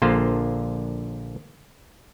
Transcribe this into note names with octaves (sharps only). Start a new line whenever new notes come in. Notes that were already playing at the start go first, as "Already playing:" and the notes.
A#1 D3 A#3 F4 C5